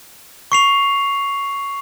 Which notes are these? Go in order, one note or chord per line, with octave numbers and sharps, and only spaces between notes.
C#6 C7 F7